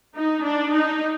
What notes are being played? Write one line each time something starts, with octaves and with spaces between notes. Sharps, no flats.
D#4
D4
D#4